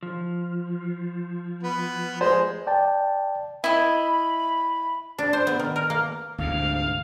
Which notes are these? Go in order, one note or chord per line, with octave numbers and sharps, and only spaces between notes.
F3
B3 B4
G#3 C5
D5 G5 A5
E4 D#5 E5 B5
D4
C5
B3
D#3
A#4
A#3
D2 G#2 C3 F5